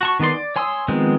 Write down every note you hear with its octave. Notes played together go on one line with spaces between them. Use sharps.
F#4 A5 C#6
D#3 B3 G#4 D5 C6
D5
C#5 G#5 C6 D#6 E6
D#3 F3 G#3 B3 C4